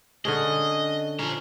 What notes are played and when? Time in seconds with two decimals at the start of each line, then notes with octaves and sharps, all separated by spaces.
0.25 D3 C#4 G#4 D#5
1.19 F3 C#4 C5 A#5